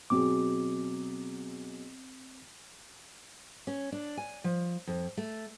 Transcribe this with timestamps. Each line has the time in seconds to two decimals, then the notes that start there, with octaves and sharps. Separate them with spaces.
0.10 B2 F#3 C4 G#4 D6
3.67 C#4
3.92 D4
4.17 G#5
4.44 F3
4.87 F2
5.17 A3